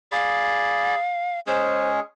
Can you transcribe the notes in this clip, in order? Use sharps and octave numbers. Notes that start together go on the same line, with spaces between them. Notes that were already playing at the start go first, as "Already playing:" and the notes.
G#4 D5 F5 B5
G#3 C#4 G#4 C5